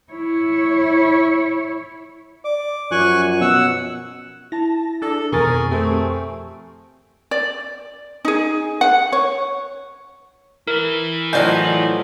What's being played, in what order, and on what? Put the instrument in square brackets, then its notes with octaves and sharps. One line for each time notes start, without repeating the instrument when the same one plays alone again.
[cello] E4 C#5
[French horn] D5 [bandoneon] D6
[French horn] F#2 [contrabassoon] F3 [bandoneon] G#5 C#6 F#6
[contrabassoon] B2 [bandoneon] F#5 E6
[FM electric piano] E4 [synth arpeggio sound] A5 A#6
[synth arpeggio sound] D4 G#4 [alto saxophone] A4
[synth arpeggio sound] F2 G#5 C#6 [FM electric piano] B2 D#3 A6 [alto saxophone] G#4 [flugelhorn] A#4
[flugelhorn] A3 [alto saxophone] C4 [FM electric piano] G4
[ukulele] D5
D#4 G#4
F#5
C#5
[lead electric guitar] E4 B4 [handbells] A#4
[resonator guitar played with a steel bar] A2 F3 F#3 [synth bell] D5 G6 [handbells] D#5 G#5